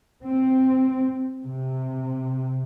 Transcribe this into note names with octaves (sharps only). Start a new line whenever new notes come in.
C4
C3